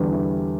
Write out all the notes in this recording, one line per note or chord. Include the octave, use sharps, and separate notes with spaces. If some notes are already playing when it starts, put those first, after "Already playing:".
Already playing: E2 D3 G3
E4